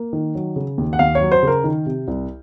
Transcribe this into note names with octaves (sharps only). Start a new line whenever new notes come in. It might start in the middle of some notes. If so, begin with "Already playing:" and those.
Already playing: A#3
D#3
F#3
C#3
D#2
F#5
D#2 F5
C#5
F#3
C5
C#3 A#4
D#3
C3
C2